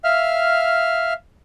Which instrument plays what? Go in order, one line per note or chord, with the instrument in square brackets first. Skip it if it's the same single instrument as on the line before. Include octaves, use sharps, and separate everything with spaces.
[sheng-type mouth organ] E5 F5 F6